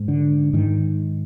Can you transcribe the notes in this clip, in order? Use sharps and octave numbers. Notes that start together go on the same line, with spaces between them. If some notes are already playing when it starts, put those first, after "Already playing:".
Already playing: G#2
D3
G#2 D#3